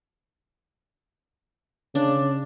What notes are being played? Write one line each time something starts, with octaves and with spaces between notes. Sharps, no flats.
C#3 D4